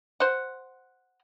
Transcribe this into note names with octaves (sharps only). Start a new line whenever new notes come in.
C5 F#5